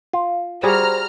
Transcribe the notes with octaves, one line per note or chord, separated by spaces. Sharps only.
F4
G3 F#4 G#4 C5 A#5 F6